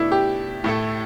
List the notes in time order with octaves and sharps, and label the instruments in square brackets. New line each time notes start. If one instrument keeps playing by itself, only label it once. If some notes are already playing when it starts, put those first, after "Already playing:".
Already playing: [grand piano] B2 A3 D4 A4 D5 [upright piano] E4
[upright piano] G4
[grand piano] A2 A3 E4 A4